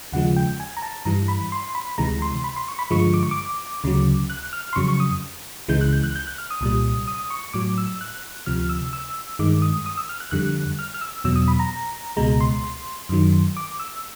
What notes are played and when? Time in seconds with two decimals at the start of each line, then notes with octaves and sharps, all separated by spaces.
0.12 D#2 C#3 F3 G#3 F#5
0.36 G5
0.60 G#5
0.77 A#5
0.83 A5
1.05 G2 E3 G3 A#5
1.28 B5
1.52 C6
1.75 B5
1.98 D2 C3 E3 G#3 A#5
2.22 C6
2.44 B5
2.56 C6
2.68 C#6
2.79 B5
2.91 G2 D3 F3 G#3 C#6
3.14 D6
3.23 C#6
3.31 D6
3.84 D2 C#3 F#3
4.30 F#6
4.53 F6
4.73 C6
4.76 F2 C#3 F#3 C#6
4.88 C#6
5.00 D#6
5.68 C#2 C#3 E3 G#3 G6
5.81 F#6
5.93 G6
6.04 F#6
6.15 G6
6.27 F#6
6.38 F6
6.50 D#6
6.61 C2 A#2 G3
7.07 D#6
7.30 C#6
7.53 A2 F#3 D6
7.78 E6
8.01 F#6
8.46 D2 C3 F3 F6
8.69 E6
8.93 E6
9.39 G2 D#3 G#3 D6
9.62 D#6
9.86 D#6
9.97 E6
10.09 F6
10.20 F#6
10.31 F2 D3 G3 F#6
10.79 F6
10.94 F6
11.01 E6
11.24 E2 B2 F#3 E6
11.36 D#6
11.48 B5
11.59 A#5
12.17 C#2 B2 G#3 A#5
12.41 C6
13.09 F#2 D#3 F#3
13.57 D6
13.80 E6